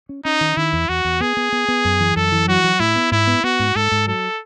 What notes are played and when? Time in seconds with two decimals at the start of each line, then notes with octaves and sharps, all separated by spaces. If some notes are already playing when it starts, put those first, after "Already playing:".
0.09 C#4
0.25 C#4 D#4
0.41 D#3
0.57 D#3 E4
0.73 E2
0.89 E2 F#4
1.05 E2
1.20 B3 G#4
1.37 B3
1.52 B3
1.68 B3
1.85 F#2
2.00 E3
2.16 F#2 A4
2.32 E3
2.48 F#3 F#4
2.64 F#3
2.79 A2 E4
2.96 B3
3.12 G#2 E4
3.27 B3
3.44 B3 F#4
3.59 G#2
3.75 G#2 A4
3.91 G#2
4.07 F#3 A4